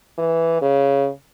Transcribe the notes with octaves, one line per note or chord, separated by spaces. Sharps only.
E3
C#3